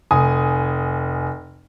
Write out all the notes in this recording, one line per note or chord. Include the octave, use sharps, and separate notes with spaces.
F1 G#5 D#6